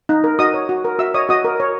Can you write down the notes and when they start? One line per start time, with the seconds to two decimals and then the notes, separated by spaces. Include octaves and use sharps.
0.09 D#4
0.24 A#4
0.39 F#4 D#5 D#6
0.54 C#5
0.69 F#4
0.84 A#4
0.99 F#4 E5 E6
1.14 C#5 D#5 D#6
1.29 F#4 D#5 D#6
1.45 A#4
1.60 C#5